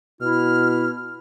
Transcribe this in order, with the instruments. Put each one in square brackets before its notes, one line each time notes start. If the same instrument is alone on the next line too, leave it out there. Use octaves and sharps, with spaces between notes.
[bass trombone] B2 [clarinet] E4 [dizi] F6